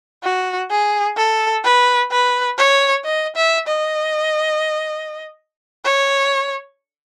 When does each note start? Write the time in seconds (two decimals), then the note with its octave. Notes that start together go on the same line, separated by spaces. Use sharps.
0.24 F#4
0.71 G#4
1.17 A4
1.64 B4
2.11 B4
2.58 C#5
3.05 D#5
3.36 E5
3.68 D#5
5.85 C#5